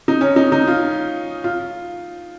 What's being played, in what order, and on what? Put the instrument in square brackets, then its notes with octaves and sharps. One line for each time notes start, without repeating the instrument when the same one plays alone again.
[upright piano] D#4
C#4
D#4
D#4
F4
F4